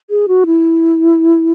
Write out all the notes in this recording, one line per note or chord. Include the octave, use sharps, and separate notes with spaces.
G#4
F#4
E4